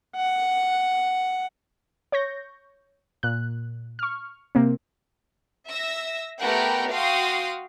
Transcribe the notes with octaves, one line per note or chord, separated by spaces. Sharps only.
F#5
C#5 C#6 G6 A#6
A#2 F#6
C#6 F6
C3 A#3 C4
E5 E6 A#6
A3 B3 G4 A#4 F#5 G5
F#4 F5 G5 C6 D#6